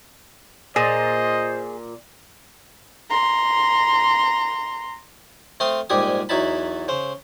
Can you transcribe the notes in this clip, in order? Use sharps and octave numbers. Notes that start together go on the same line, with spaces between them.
A#2 G#4 C5 D#5
A#5 C6
A3 C4 F5 C6 D#6
A#1 G#2 G3 G4 G#5 D#6
E2 F#3 D#4 E4 A5 B5
C#3 C5